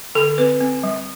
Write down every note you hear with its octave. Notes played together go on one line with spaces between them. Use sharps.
D3 A4
C4 B4
C4
G3